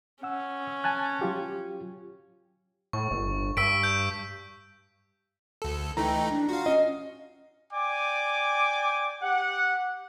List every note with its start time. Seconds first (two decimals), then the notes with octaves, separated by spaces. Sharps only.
0.23 C#4 F#5 E6
0.84 G#5 A5 F#6
1.21 F#3 F4 G4
2.93 A2 C#6
3.11 G1
3.57 G2 E6 B6 D7
3.83 G6
5.62 D2 A4
5.97 E3 A3 D#4 G5 A#5
6.29 D4
6.49 F4 F#4 F5
6.66 C#4 D#5
7.73 D5 G5 G#5 D6
9.22 G4 F#5